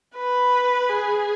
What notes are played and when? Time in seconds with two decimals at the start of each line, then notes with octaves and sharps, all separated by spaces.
0.16 B4
0.90 G#4